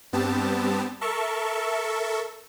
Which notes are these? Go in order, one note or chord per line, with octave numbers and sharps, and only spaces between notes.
G2 G3 B3 C4 G4 A5
A4 A#4 E5 C#6